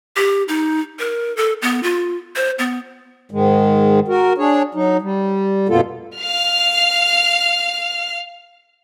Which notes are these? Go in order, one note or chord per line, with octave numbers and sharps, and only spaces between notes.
G4
D#4
A#4
A4
B3
F4
C5
B3
G#2 D#3 G#3
F#4 A#4
D4 G#4 C#5
F#3 D#4
G3
F#2 B2 A#3 B3 F4 A4
F5 F6